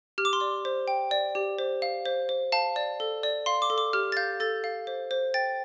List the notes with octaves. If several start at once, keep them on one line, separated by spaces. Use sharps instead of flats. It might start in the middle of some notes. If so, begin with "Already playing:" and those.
G4 F6
D6
C6
D5 D6
C5
G5
D5
G4
C5
F5
C5
C5
F5 A5
D5
A4
D5
F5 C6
D6
A4
D6
G4 F6
A6
F5 G6
A4 A6
F5
C5
C5
G5 A6